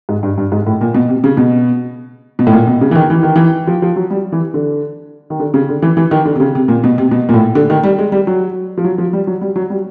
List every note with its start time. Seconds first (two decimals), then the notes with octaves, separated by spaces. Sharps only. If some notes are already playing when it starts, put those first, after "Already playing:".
0.09 G#2
0.23 G2
0.38 G2
0.52 G#2
0.67 A2
0.81 A#2
0.94 B2
1.09 C3
1.24 C#3
1.37 B2
2.39 B2
2.47 A2
2.53 A#2
2.67 B2
2.81 C#3
2.91 E3
2.95 D#3
3.10 E3
3.23 D#3
3.36 E3
3.67 F3
3.82 F3
3.96 F#3
4.10 G3
4.32 E3
4.54 D3
5.30 D#3
5.40 D3
5.54 C#3
5.69 D3
5.82 E3
5.97 E3
6.11 D#3
6.25 D3
6.36 C3
6.40 C#3
6.55 C3
6.68 A#2
6.84 B2
6.98 C3
7.11 B2
7.29 A#2
7.34 A2
7.55 D3
7.70 D#3
7.83 G3
7.99 G#3
8.12 G3
8.27 F#3
8.77 F3
8.84 F#3
8.98 F3
9.13 G3
9.27 F#3
9.41 G3
9.56 F#3
9.70 G3